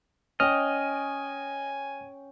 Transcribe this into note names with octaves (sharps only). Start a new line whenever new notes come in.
C#4 D#5 G5 G#5 F6